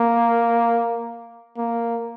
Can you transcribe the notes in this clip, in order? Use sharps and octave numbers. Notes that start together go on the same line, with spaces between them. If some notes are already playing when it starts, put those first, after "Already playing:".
Already playing: A#3
A#3